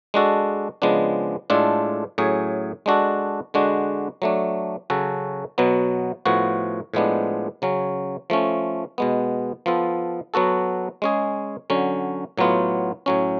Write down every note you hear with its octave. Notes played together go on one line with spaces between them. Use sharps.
G#3 D4 F#4 A4
C#3 F3 G#3 B3 D4
A2 G#3 D4 F4 A4
A2 F#3 C#4 G#4
G#3 D4 F#4 A4
D3 G#3 D4 F#4
F#3 A3 D4
C#3 F#3 C#4 F#4 A4
B2 F#3 B3
A2 F3 B3 F#4
A2 F3 G#3 B3 D4
C#3 F#3 C#4
F3 A3 C#4
B2 G#3 B3
F3 B3 F4 A4
F#3 B3 F#4 A4
G#3 C#4 G#4
D3 F#3 C#4
A2 F#3 B3 F4
A2 F#3 C#4